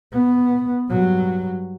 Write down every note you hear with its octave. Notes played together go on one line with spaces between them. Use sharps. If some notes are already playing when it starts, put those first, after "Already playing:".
B3
G2 F#3